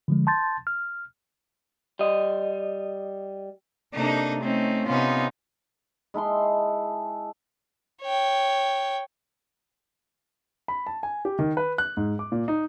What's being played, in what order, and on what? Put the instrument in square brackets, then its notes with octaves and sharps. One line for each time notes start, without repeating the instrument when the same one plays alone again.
[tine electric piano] D3 F3 G#3
A5 C6 G6 A6
F6
[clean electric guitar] G3 D#5
[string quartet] C3 A#3 D4 D#4 A4
A3 C4 C#4 D#4
C3 B3 C#4 D#4 F4
[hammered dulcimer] G#3 E4 A5 C6
[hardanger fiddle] C#5 G5
[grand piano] B5
A5
G#5
G4
D#3
B4
F#6
G#2
D6
A#2
D#4